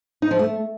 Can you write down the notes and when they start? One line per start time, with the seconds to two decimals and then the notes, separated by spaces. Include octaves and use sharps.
0.22 D#4
0.31 F3
0.39 A3